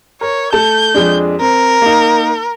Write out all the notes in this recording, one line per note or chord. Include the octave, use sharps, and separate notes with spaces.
A#4 C#5
A3 A5 G6
F2 G#3 D4
C4 A#4
A#3 D#4